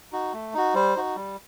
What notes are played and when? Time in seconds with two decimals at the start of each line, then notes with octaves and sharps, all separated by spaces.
0.12 D#4 F#4
0.33 A3
0.54 D#4 F#4
0.74 G3 C5
0.96 D#4 F#4
1.16 G3